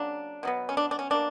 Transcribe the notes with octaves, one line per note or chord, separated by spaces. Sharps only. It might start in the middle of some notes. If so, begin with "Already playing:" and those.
Already playing: C#3 F#3 A#3 D4
B2 F#3 B3
C#4
D4
D4
C#4
B2 A#3 D4